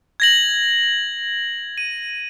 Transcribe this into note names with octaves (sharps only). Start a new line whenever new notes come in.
G#6 A#6 F#7
D#7